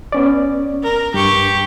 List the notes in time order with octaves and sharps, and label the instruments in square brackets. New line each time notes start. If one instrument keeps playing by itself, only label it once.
[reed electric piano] B3 C#4 D5
[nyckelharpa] A#4
[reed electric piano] G2 [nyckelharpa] G4 C#6